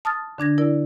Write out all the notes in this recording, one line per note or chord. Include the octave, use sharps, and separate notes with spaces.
A5 D#6 F6 A6
D3 D4 G#6 A#6
E4 A#4 D5